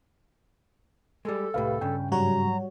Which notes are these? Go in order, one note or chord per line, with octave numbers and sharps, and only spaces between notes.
G3 G#3 A4
C2 A2 G4 B4 F5
G2 C#3 G5
G#2 F#3 G3 F#4 C#5 A#5